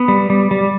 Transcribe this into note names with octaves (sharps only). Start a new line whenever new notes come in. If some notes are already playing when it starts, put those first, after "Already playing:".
Already playing: B3
G3
G3
G3